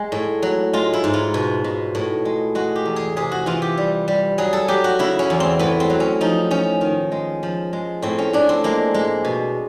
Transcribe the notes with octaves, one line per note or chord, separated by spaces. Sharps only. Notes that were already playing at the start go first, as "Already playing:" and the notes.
Already playing: G#3
A2
F#3
G#3 F4
E4
G#2
F4
B2
B2
A2
G#3
G#3 F#4
G4
E2
G#4
C3 G#4
F#4
E3 F4
G4
G3
G3
F#3 G#4
A4
F#3 G4
F#4
C#3 E4
C#4
E2
C4
A2 B3
C4
F#3
C#4
F3 D#4
F3 C#4
D#3
G#3
F3
G#3
A2 C4
C#4
A2 D4
C4
G#3 A#3
G#3
B2